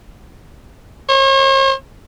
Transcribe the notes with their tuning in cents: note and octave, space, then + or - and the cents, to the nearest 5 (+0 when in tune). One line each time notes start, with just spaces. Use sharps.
C#5 -45